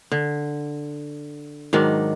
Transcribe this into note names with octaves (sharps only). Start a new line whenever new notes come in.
D3
G#2 D#3 F#3 D4